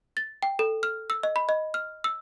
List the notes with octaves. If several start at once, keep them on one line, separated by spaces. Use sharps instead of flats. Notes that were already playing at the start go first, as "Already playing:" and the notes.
A6
G5
A4
F6
E6
D#5
B5
D#5
F6
E6